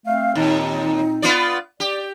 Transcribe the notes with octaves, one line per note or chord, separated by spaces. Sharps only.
A3 C4 F5
D#2 A#2 C4 D#4
B3 F4 D5
G4 D5